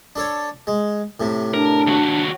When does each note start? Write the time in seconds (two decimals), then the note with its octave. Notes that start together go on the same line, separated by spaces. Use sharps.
0.16 D4 A4 C#5
0.67 G#3
1.20 A2 C3
1.54 D4 A#4
1.87 D#2 F#4